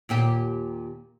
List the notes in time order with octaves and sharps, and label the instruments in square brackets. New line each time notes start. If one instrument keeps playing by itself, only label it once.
[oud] D#2 A#2 G4